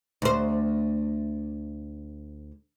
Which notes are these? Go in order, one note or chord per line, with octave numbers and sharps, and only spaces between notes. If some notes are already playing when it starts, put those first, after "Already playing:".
D2 C5